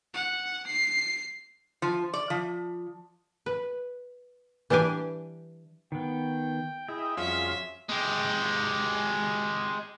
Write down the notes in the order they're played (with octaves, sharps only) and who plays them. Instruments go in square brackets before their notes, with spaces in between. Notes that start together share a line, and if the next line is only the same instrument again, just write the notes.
[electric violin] F#5
C7
[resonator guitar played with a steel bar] F3
D5
F3
[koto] B4
E3 G3 D4 G4 G#5
[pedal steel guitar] D#3 B3 [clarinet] G5
[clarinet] E4 [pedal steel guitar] G#4 [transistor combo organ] D#5 E5 G5
[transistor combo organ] F2 F4 F5 [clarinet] G3 [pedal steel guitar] C#4 F#4 G#4 [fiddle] E5
[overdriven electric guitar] G#3 G4